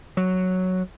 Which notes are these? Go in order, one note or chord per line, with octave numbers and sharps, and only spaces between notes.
F#3